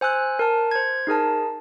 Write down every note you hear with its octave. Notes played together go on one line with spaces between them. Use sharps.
C5 G#5 E6 F#6
A#4 A5
C5 G#6
D#4 G#4 A#4 A5